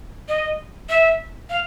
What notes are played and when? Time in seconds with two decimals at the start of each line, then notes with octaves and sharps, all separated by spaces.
0.28 D#5
0.89 E5
1.50 F5